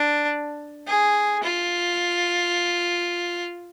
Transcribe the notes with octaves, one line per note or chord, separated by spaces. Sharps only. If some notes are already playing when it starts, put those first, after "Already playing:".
Already playing: D4
G#4
F4